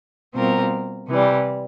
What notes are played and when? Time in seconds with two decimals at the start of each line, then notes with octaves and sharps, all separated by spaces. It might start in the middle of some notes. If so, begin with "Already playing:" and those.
0.34 B2 G3 C4 F4 A#4
1.08 C3 E3 G3